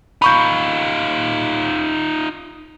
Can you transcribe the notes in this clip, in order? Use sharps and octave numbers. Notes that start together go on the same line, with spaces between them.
D#4 F4 B5 C#6 G6